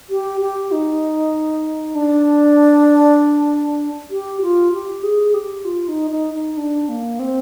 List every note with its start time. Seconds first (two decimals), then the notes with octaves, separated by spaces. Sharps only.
0.10 G4
0.41 G4
0.72 D#4
1.95 D4
4.11 G4
4.42 F4
4.73 G4
5.03 G#4
5.34 G4
5.65 F4
5.88 D#4
6.11 D#4
6.34 D#4
6.57 D4
6.89 A#3
7.19 C4